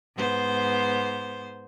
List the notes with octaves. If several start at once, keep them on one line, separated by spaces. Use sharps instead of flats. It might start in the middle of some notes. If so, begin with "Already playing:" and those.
G#2 B3 C5